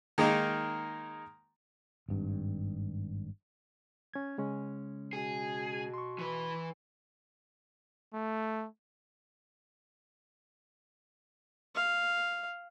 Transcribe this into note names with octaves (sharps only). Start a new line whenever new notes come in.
D#3 G#3 A#3 D#4
G#1 G2
C#4 G#6
C#3 G#3 C#4
B2 G#4
C6 C#6
E3 B4
A3
F5